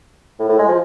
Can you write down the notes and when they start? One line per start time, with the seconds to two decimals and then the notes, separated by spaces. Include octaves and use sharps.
0.39 A2
0.49 A2
0.59 G#3
0.68 F3